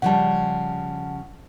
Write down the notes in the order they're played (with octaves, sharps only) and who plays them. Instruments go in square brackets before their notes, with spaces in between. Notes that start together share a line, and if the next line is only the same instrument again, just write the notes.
[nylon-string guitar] C#3 F3 G3 [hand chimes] F#5 A5